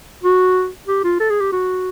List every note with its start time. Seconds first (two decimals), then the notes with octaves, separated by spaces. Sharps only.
0.23 F#4
0.88 G4
1.04 F4
1.20 A4
1.30 G#4
1.40 G4
1.52 F#4